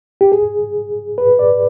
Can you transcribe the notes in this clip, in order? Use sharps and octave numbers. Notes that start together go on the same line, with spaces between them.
G4
G#4
B4
D5